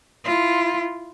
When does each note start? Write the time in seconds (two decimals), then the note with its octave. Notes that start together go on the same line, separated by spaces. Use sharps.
0.24 E4 F4